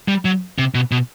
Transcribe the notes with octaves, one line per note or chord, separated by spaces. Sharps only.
G3
F#3
C3
B2
B2